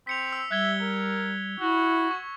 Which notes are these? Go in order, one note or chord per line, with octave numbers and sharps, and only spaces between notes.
C4 B6 C#7 F7
E6
G3 E5 F#6 G#6 G7
A#4
E4 F#4
C#6